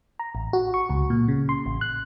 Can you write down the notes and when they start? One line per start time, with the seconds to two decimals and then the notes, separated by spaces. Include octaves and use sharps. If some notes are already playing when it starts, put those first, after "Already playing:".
0.19 A#5
0.35 A1
0.53 F#4
0.74 C#6
0.90 C#2
1.10 A#2
1.28 C#3
1.49 C6
1.66 A1
1.81 F#6